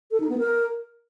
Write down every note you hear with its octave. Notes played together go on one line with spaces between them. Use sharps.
A4
D#4
B3
A#4